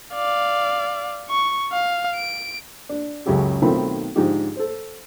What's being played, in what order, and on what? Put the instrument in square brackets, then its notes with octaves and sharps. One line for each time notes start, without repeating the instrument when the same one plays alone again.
[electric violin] D5 F5
C#6
F5
D7
[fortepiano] D4
C#2 F#2 C#3 G4 A4
B1 D#3 A3 C4 F4 B5
G#2 D3 F3 D#4 F4 G4
A4 C5